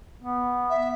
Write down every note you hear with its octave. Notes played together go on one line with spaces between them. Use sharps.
B3
E5